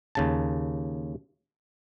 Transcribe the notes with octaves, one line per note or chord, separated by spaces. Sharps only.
D#2 C#3 A5